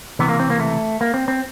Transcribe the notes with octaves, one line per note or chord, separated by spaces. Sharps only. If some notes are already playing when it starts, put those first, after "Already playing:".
C#2 C3 E3 B3
A#3
C4
A#3
A3
A#3
C4
C4